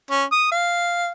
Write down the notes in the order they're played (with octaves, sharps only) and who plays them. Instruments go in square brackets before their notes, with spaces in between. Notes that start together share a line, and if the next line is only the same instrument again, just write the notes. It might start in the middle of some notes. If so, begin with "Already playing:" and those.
[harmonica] C#4
D#6
F5